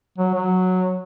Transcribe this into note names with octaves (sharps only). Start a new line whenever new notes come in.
F#3
F#3